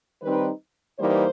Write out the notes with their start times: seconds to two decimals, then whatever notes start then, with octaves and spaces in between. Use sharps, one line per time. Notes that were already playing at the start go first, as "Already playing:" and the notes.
0.22 D#3 G3 C4 D#4 B4
0.99 E3 G3 A#3 D#4 C5